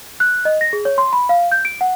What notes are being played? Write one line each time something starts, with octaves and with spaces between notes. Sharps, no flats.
F#6
D#5
A#6
G#4
C#5
C6
B5
F5
G6
D7
F#5